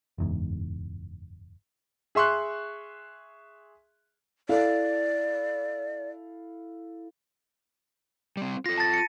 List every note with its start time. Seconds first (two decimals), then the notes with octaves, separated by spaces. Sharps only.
0.18 F#1 E2 G#2
2.15 G#4 E5 C6 C#6 F#6
4.49 E4 A4 D5 F5
8.37 G3 C4
8.66 F4 A4 A#6
8.78 A5 A6
8.94 C#7 D#7